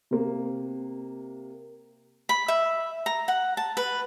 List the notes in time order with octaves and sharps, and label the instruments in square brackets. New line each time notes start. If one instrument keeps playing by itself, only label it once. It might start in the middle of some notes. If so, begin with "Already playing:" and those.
[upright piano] C3 A#3
[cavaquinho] B5
E5
A#5
F#5
A5
B4